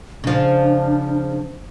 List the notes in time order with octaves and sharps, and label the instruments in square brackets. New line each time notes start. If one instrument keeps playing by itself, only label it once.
[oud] C#3 F3 [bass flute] D4